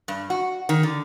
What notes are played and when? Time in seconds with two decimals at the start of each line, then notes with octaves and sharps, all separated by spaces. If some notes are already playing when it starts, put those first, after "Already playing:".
0.08 G2
0.30 F#4
0.69 D#3
0.83 D3